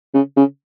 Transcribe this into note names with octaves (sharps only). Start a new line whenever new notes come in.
C#3
C#3